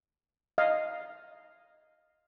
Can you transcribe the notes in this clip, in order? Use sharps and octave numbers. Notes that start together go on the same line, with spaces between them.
D#5 F5